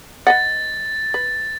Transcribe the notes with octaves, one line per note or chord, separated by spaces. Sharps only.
B4 D#5 F#5 A6
B4